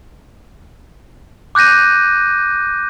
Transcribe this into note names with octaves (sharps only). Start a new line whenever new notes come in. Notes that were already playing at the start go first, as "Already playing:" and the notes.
D6 F#6 G6 A#6 D#7